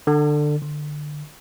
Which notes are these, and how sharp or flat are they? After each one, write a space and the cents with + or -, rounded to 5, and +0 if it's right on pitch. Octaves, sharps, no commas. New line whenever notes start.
D3 +20
D3 +20